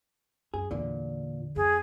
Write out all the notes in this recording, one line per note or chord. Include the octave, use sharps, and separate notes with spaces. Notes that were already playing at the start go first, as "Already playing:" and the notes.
F#2 G#4
E2 A#2 D3
F2 G#4